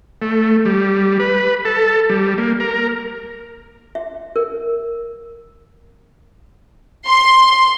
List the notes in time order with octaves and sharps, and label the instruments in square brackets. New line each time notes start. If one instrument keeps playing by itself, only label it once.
[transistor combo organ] A3
G3
B4
A4
G3
A#3
A#4
[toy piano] E5
A#4
[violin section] C6